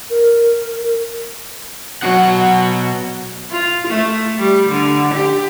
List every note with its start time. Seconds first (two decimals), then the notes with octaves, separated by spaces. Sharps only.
0.10 A#4
2.02 B2 F#3 F#5
3.51 F4
3.87 A3
4.39 G3
4.69 D3
5.14 G4